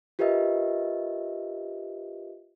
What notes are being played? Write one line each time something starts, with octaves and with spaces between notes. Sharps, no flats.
F4 G4 A#4 B4 D#5 E5